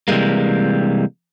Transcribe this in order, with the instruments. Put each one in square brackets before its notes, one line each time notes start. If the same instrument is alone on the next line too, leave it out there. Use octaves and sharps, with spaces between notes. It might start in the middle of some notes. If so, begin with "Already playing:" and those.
[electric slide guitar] C3 E3 G3 G#3 A#3